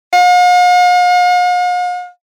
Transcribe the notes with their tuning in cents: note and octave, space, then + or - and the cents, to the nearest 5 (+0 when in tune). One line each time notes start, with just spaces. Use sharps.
F5 +45